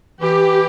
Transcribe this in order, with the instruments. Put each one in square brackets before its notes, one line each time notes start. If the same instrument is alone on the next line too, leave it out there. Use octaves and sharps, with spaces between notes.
[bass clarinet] E3 [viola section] G4